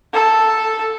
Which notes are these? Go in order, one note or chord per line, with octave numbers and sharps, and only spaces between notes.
A4